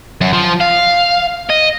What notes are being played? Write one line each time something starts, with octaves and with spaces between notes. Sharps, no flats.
F#2
F3
F5
D#5